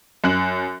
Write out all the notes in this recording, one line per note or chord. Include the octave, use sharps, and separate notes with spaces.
F#2 F#6 F#7